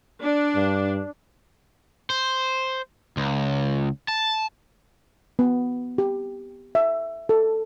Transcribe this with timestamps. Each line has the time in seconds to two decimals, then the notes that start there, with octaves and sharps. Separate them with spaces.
0.19 D4
0.55 G2
2.10 C5
3.17 C#2
4.08 A5
5.39 B3
5.98 G4
6.75 E5
7.29 A4